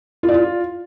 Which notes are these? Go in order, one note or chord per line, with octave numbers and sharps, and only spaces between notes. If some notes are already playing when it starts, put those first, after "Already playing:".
F4
D5
F4